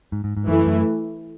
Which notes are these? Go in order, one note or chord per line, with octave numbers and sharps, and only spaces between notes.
G#2
G#2
G#2
F#2 E3 A3 E4
F#2